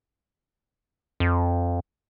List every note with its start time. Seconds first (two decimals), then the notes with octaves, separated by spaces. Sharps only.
1.20 F2